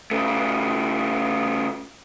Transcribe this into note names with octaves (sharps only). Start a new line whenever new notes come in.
C#3 A3